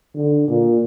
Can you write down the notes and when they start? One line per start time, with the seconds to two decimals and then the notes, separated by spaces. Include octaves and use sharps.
0.14 D3
0.48 A#2